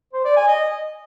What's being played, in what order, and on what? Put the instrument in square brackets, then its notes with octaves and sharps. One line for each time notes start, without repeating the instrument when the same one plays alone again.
[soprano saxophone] C5
D5
G#5
D#5